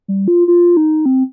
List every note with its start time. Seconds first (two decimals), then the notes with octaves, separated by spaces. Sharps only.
0.08 G3
0.28 F4
0.48 F4
0.77 D#4
1.06 C4